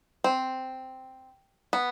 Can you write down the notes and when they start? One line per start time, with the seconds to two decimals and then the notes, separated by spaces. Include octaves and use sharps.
0.24 C4
1.73 B3